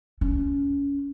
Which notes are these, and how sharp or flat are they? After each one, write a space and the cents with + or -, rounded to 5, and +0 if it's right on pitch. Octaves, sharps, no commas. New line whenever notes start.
C#4 +20